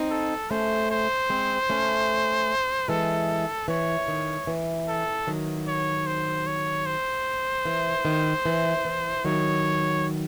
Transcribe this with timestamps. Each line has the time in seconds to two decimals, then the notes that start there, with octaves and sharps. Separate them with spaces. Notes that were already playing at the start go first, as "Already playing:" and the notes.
Already playing: C4 D#4
0.11 A4
0.50 A3 C#4 C5
0.91 C5
1.30 G#3 C4
1.70 A3 C#4
2.88 E3 G#3 A4
3.68 E3 C#5
4.08 D#3
4.47 E3
4.88 A4
5.27 D#3 F#3
5.67 C#5
6.07 C5
6.47 C#5
6.86 C5
7.65 E3
8.05 D#3
8.46 E3
8.85 E3
9.25 D#3 F#3 C#5